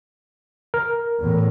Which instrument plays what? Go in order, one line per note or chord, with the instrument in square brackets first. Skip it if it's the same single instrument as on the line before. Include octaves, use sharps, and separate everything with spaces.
[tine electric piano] A#4
[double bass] E2 A2